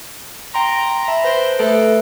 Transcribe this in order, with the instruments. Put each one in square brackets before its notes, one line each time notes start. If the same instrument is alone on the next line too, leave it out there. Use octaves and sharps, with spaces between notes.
[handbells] G5 C6 [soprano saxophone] A#5
[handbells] E5 A5 B5
[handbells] B4 A#6 D7 [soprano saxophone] C5
[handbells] A3 B4 D7 [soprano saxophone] A4